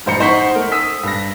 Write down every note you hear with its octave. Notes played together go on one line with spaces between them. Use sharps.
A1 G2 C5 A#5 C#7
D#4 C5 F#5 C#6 B6
A3 A#4
D#6 E6 B6
G2 A#6